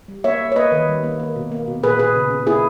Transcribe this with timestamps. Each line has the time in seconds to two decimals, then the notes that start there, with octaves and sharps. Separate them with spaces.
0.08 G3
0.24 A#3 C#5 E5
0.40 A#3
0.52 C#5
0.56 A#3 B4 D#5
0.72 D#3
0.88 G3
1.04 A#3
1.20 A#3
1.36 B2
1.52 A#3
1.68 B2
1.83 A#2 G#4 B4
1.99 A#2 G#4 B4
2.15 C#3
2.31 C#3
2.47 A#3 E4 G#4